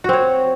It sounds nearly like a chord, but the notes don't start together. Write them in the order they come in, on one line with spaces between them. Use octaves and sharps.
F#4 C4 C#5